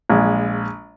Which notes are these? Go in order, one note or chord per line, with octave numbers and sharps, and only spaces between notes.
A#1 G#3